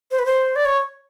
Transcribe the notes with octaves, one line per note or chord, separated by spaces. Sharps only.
C5
B4
C5
D5
C#5